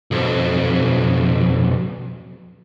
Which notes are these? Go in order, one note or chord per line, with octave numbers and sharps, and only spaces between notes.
B1 F2